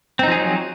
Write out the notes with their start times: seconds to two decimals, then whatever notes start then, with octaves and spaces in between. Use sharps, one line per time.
0.19 C4
0.23 D#4
0.27 F3
0.32 G#4
0.36 F#3